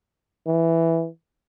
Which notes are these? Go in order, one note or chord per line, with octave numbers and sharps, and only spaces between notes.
E3